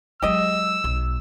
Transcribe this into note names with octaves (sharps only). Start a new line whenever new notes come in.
F#3 G#3 G4 D#5 E6
B1